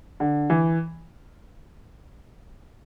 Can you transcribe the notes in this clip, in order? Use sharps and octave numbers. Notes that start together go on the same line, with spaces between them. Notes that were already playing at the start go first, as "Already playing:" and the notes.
D3
E3